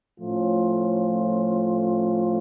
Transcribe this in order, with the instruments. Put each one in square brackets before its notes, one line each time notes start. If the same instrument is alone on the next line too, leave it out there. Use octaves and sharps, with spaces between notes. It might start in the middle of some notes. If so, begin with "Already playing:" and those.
[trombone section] A2 F3 A3 C#4 F4